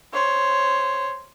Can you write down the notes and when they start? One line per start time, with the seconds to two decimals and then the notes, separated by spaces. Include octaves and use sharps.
0.13 C5 C#5